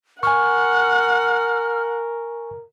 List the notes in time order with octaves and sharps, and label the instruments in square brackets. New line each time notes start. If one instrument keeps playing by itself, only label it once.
[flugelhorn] A#4 [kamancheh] F#5 [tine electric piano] G#5 C#6 [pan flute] F6